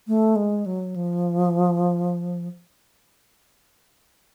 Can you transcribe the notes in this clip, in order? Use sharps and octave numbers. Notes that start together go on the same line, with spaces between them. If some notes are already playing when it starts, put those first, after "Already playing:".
A3
G#3
F#3
F3